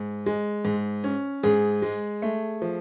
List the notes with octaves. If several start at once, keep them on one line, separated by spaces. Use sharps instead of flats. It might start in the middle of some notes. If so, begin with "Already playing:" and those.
Already playing: G#2
G#3
G#2
C#4
G#2 G#4
G#3
A3
F3